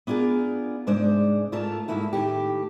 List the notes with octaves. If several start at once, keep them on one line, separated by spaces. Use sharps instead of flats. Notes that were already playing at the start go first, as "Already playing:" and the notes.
B3 D4 F4 G#4 A#4
G#2 C3 G#3 D4 C5 D5
G#2 A3 F4 A4 A#4 A5
G#2 A3 A#3 E4 F#4
A2 D#3 G4